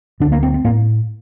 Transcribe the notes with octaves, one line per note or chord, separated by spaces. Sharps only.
D2 D3 D4
A#3
C4
C4
A2 A#3